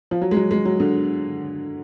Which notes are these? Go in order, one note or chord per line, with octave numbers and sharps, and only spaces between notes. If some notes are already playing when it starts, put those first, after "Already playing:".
F3
F#3
G#3
F#3
G#3
F#3
D3